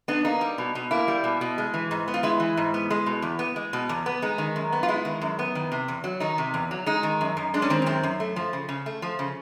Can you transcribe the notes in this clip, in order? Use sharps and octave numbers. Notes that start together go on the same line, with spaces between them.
B3 D4
A#3 D#4
G3
B2
B2
A#3 E4
G3
B2
B2
G#3
E3
G#2
B3
F4
G#3 E4
E3
G#2
B3
G#3
B2
E2
B3
G#3
B2
E2
B3
G#3 D#4
D#3
F#2
B3
F4
G#3 E4
D#3
F#2
B3
D#3
C3
E2
F#3
D#3 D#4
C3
E2
F#3
G#3 D#4
D#3
F#2
F#2
G#3 D4
C#4
D#3 C4
C#4
F#2 C4
F#2
A3
F3
C#3
C#3
A3
F3
C#3